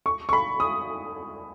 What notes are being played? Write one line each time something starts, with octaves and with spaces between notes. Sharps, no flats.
C#6
C#6
B5
D#6